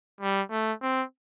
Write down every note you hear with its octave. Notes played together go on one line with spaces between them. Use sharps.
G3
A3
C4